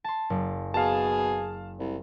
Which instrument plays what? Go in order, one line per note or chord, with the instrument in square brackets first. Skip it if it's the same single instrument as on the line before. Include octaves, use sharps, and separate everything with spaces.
[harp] A5 C6
F#1
[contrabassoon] B2 [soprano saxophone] G#4 [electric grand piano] F5 A5
[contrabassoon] C2